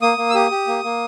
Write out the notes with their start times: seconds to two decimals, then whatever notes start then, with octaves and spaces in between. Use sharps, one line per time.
0.02 A#3 D#6
0.18 A#3
0.30 E6
0.35 G4 D#6
0.51 G4
0.67 A#3
0.83 A#3